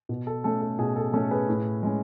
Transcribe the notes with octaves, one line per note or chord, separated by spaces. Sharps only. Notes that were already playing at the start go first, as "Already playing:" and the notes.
B2
A4
A3 C#4 A4
A4
B2 G#4
A4
A3 C#4 A4
G#4 B4
A2
G#3 C#4